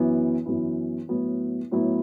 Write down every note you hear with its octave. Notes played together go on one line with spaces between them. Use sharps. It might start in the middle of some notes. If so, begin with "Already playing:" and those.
Already playing: F#2 E3 B3 E4
F#2 E3 B3 E4
A2 F#3 B3 E4
A2 F#3 B3 E4